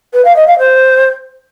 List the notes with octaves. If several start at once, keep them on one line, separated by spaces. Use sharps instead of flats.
B4
F5
D#5
F5
C5